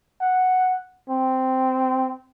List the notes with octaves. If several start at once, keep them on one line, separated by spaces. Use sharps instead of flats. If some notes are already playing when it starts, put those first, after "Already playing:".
F#5
C4